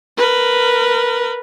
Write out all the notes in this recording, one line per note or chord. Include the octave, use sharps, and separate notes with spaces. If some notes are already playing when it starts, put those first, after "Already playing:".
A#4 B4